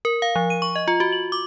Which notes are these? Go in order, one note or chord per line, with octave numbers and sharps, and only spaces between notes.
A#4
F5
F3
D#7
C#6
D#5
F4
F#4
F#7
D6